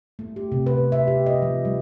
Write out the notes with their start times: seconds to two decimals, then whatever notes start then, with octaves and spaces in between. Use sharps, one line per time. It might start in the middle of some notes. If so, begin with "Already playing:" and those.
0.19 A3
0.36 G4
0.52 C3
0.66 B4
0.92 E5
1.08 G4
1.26 D#5
1.42 F3
1.65 G3